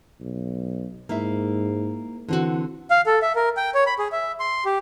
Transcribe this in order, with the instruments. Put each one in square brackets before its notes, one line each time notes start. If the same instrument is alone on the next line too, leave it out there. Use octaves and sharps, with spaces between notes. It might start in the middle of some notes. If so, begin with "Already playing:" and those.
[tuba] B1
[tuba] G#2 [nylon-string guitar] A#3 E4 E5
[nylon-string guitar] D3 C4 F#4 [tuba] E3
[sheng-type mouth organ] F5
A4
E5
A#4
G5
C#5
B5
G#4
E5
C6
G4